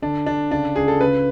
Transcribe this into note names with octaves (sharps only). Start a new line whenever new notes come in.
D3 D4
D3 D4
C#3 D4
C#2 G#4
A4
C#3 B4